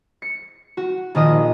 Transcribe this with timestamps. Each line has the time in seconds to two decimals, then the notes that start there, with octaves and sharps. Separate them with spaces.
0.22 C#7
0.77 F#4
1.15 A#1 D#3 D#5 D#6